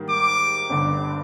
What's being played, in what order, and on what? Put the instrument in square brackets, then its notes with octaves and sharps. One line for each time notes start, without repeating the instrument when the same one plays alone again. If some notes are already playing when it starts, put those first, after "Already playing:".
Already playing: [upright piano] G#2 D#3 G3 A#3
[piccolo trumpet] D6
[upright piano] G1 G2 D3